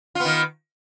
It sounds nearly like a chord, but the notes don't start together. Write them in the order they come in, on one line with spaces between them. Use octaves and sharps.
F4 B3 D#3